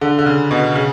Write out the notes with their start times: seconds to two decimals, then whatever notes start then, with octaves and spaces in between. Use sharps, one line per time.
0.01 D3
0.19 D3
0.26 C#3
0.51 B2
0.75 C#3